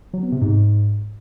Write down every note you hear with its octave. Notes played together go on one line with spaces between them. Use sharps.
F#3
B3
C3
G#2